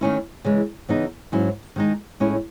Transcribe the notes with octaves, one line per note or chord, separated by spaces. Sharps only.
D#3 A3 C#4 E4
C#3 E3 G#3
C#3 E3 B3 D#4
G#2 F#3 C#4 E4
D#3 G#3 D#4
A2 G#3 C#4 E4